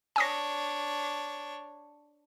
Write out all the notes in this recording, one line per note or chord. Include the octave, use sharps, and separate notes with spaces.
D4 C#5 G#5 D#6 A#6